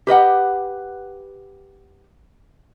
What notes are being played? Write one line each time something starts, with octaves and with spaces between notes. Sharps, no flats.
G4 B4 D#5 F#5